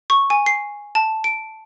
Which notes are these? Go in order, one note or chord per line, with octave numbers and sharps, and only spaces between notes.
C#6
G#5
C7
A5
D7